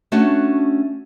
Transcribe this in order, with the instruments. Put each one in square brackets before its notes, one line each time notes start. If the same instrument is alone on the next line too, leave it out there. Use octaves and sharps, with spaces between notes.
[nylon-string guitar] A3 C#4 D4 F#4